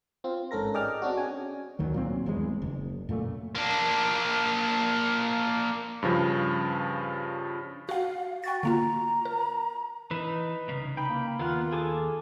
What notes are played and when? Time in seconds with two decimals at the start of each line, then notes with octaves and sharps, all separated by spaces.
0.24 C4 F4
0.51 A1 G#2 C#4 A4 A#4 A#6
0.74 G#4 D5 D#5 G5 D6 F6
1.02 C4 D4 F#4
1.17 C#4 G#4 G#5
1.79 D2 D#3 F#3
1.94 A#2 F#3 C4
2.26 D#1 E2 G2 G#3
2.62 F#1
3.09 F#2 A#2 A3
3.55 A#3 D4
6.03 G2 C#3 F3
7.89 F#4 F5 F#5
8.44 F#4 G5 A6
8.63 D3 A#3 F4 A#5
9.25 A#4
10.11 E3 D#4 B4
10.68 C2 C#3
10.97 D#4 G5 B5
11.09 A#3
11.39 D#2 B3 F4 A#4 F#5
11.73 G#4 A4 D6